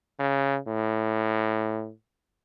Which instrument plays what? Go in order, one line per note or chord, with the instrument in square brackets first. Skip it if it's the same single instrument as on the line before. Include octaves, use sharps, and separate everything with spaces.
[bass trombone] C#3
A2